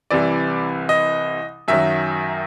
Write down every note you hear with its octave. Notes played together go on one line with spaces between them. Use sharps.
C2 C3 E3 D5
D#5
F#2 D#3 F#3 E5